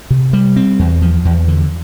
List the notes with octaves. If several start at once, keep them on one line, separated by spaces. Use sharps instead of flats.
C3
G3
C4
E2
F3
E2
D3